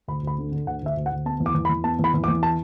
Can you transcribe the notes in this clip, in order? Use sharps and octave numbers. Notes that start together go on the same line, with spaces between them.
D2 B5
D2 B5
D3
D3
D2 F#5
D2 E5
D2
F#5
D2
B3 A5
E2
D6
E2
B5
E2
B3 A5
E2 B5
E2
D6
E2
A5